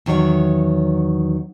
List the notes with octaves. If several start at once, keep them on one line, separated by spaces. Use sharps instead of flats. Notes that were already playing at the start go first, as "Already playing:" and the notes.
E2 D#3 F#3 C#5 F#5